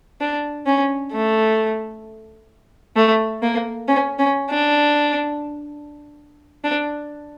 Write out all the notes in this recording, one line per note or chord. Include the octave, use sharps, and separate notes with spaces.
D4
C#4
A3
A3
A#3
C#4
C#4
D4
D4